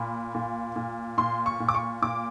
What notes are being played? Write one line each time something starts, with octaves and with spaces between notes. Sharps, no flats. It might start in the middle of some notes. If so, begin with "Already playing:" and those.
Already playing: A#2 B5
A#2
A#2
A#2 C6
C#6
A#2
D6
C#6
A#2 D6